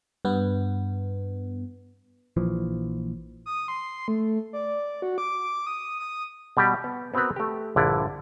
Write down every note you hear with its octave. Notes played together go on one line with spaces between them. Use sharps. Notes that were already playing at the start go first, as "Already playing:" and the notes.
G2 B3
A#1 E3 F3
D#6
C6
A3
D5
F#4
D6
D#6
D#6
B2 G3 G4
B3
B3 C4 F#4 A#4 B4
A3 G4
A#1 G2 D3 E4 D5